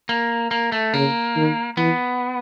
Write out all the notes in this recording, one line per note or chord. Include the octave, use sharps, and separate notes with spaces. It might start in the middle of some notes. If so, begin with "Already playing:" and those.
A#3
A#3
A3
C#3 A#3
D#3
E3 B3